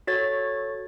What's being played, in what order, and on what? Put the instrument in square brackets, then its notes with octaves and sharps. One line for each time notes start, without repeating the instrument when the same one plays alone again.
[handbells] F#4 A4 C#5 A6